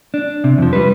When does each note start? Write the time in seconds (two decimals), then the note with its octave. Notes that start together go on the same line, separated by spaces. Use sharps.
0.14 D4
0.44 C3
0.58 F2 F3
0.73 G3 B4